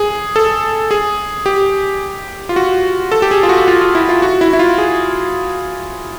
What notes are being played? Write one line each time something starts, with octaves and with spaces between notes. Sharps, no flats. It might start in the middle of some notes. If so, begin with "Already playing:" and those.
Already playing: G#4
A4
G#4
G4
F4
F#4
A4
G4
G#4
F4
F#4
F4
F4
E4
F4
F#4
E4
E4
F4
G#4